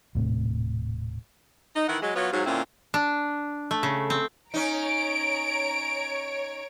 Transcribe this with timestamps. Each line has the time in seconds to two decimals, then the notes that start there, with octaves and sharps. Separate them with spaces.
0.15 D#1 A2 C3
1.75 D#4
1.87 D#3 E3 E4 F#5
2.01 F#3 G#3
2.15 F#3 B3 F4 B4 C#5
2.32 G#2 F3 F#3
2.45 A#2 D3 C4 C#4 E4
2.94 D4
3.71 A3
3.83 C#3
4.10 C4
4.54 C#4 D#4 C#5 A#5 D7